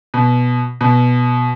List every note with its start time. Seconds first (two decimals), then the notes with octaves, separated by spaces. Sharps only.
0.14 B2
0.81 B2